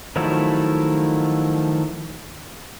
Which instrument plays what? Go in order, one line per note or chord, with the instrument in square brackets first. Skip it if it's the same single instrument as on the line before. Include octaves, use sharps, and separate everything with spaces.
[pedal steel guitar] D#3 F3 F#3 A3 E4